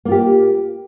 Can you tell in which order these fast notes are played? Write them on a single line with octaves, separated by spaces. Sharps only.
A#3 F4 G4